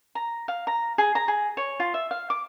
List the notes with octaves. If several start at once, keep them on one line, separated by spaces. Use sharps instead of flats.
A#5
F5
A#5
G#4
A#5
G#4
C#5
F4
E5
F5
D6